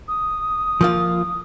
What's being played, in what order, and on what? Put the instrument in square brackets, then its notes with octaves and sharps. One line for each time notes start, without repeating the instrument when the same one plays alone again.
[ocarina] D#6
[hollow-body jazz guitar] F3 A#3 F4